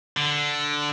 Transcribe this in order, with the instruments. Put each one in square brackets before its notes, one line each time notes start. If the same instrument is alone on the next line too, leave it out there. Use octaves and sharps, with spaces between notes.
[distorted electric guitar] D3